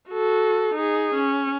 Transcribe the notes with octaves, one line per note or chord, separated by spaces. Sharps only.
F#4 A4
D#4 G#4
C#4